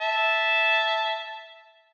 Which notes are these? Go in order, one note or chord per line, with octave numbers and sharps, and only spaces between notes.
E5 A5